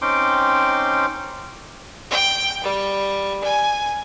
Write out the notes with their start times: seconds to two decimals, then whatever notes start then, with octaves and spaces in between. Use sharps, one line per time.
0.02 C4 C#4 D#4 G5 C6 D6
2.11 G5
2.63 G3
3.44 G#5